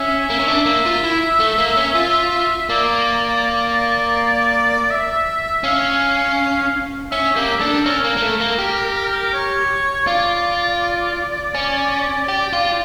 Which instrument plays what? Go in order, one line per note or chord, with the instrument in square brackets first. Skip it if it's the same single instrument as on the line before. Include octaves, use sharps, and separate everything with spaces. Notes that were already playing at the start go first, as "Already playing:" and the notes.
Already playing: [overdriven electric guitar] C#4 [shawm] E5
[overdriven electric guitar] A#3
C#4
[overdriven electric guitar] D4 [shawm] E5
[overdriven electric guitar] A#3
F4
E4
A3
A#3
C#4
F4
[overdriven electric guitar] A#3 [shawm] D5
[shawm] E5
[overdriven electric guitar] C#4 [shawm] F5
[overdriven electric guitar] C#4 [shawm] E5
[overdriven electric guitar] A#3 [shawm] G4
[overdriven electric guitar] D4 [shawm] A4
[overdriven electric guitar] C#4 [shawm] A#4
[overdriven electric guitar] A#3
A#3
A3
A#3
G4
[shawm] C#5
[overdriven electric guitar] F4 [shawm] D5
[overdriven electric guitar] C#4
G4
F4